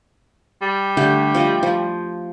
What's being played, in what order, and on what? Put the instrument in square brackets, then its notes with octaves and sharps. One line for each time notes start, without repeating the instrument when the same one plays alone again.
[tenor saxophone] G3
[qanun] D3 A3 G4
F3 F4 D#5
F3